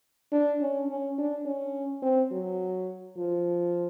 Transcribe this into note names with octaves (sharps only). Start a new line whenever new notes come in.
D4
C#4
C#4
D4
C#4
C4
F#3
F3